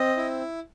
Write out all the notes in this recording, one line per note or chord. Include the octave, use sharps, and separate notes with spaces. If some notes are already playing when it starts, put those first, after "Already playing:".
Already playing: C4 D#5
E4